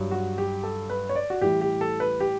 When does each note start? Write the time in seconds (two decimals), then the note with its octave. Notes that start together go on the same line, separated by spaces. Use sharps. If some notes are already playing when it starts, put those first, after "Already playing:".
Already playing: G2 F#3
0.11 F#4
0.38 G4
0.63 A4
0.90 B4
1.09 C#5
1.16 D5
1.30 F#4
1.42 A2 E3 G3 G4
1.61 G4
1.81 A4
2.00 B4
2.20 G4